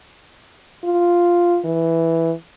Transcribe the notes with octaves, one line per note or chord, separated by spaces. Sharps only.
F4
E3